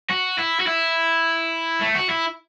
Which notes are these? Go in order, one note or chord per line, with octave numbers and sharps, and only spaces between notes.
F#4
E4
F#4
E4
A3
F#4
E4